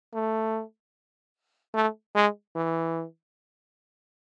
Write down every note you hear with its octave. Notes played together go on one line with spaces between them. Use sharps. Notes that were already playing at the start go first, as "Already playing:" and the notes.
A3
A3
G#3
E3